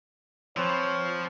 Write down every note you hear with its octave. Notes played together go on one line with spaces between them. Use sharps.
F3 C4 B4 C#5